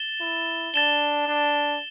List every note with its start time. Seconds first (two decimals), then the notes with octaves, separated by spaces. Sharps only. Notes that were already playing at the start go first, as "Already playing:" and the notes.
Already playing: A6 E7 G7
0.21 E4
0.74 D4 A6 E7 G7
1.28 D4